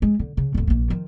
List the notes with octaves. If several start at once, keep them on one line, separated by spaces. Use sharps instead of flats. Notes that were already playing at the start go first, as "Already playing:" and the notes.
G#3
D3
C#3
D1 D2
A#1 A#3
D#3 F3